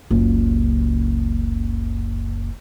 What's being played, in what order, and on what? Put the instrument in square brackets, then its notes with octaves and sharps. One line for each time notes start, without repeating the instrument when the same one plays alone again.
[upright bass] F#1 C#2